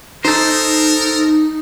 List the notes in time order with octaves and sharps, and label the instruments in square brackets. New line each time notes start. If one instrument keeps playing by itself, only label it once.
[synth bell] D#4 [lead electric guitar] A4 C5 [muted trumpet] A#4